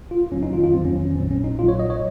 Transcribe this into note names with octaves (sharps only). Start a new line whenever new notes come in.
F4
F2 D#3 F#3 C#4
D#4
F4
F4
F2 D#3 F#3 C4
C#4
C#4
A#1 A#2 F#3 C4
C#4
D#4
A#1 A#2 F#3 F4
C#5
D#5
C#5